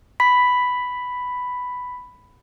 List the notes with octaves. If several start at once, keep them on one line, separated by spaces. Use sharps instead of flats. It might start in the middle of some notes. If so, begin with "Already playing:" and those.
B5 B6